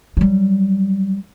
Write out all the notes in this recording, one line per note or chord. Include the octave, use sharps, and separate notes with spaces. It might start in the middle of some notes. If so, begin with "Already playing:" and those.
F#3 G3